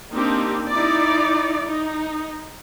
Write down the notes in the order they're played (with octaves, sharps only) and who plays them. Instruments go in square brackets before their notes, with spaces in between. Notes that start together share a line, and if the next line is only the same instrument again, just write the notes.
[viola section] A#3 C4 D4 D#4 G4
D#4 E4 D5
D#4